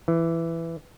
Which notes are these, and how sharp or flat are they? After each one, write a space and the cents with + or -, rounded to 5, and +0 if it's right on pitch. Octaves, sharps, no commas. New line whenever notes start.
E3 +10